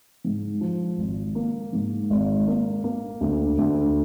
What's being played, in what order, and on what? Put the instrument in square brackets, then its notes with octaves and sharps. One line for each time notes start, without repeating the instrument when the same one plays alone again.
[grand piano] G#2
F3
G#1
A#3
G#2
G#1
A#3
A#3
D2
D2